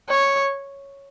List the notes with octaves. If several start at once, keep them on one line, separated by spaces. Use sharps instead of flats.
C#5